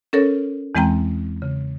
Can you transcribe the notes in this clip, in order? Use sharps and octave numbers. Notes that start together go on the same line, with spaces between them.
C#4 A4 A#4 C#5
E2 E3 G#3 C4 G5 A#5
C#3